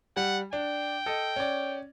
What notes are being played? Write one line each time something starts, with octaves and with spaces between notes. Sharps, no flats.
G3 F#5
D4 G5
A4 D#5
C#4 D5